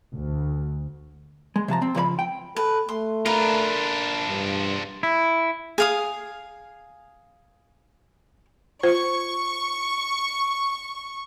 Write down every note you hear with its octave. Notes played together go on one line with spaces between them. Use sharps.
D2
G#3
C3 F3 A5 A#5
C4
C#2 F3 C#5 B5
G5
A4 B4
A3 C6
D4 F4 A#4 B4 A#5
G2
E4
G#4 F5 D#6
F4 C5 C#6